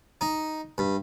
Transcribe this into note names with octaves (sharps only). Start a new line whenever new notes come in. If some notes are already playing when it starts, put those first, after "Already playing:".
D#4
G2